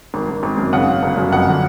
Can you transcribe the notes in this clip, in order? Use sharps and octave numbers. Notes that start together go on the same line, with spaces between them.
G#1
G#1
G#1
F#2
C#3 F#5
C#3
G1
F#2
F2 F#5
D3